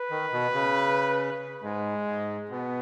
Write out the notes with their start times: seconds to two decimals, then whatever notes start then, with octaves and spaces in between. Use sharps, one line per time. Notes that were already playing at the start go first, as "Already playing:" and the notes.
Already playing: B4
0.10 D#3
0.32 B2
0.54 C#3
1.63 G#2 G#3
2.07 G#2
2.50 B2 B3